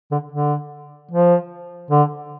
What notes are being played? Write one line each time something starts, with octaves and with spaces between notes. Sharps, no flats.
D3
D3
F3
D3